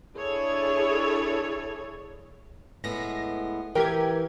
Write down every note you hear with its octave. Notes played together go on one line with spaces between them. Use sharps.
D4 E4 G#4 A4 C#5
A2 G#3 B3 A#6
E3 G4 A#4 G5 G#6